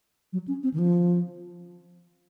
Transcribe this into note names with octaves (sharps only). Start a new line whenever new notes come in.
F#3
C#4
C4
D#3
F3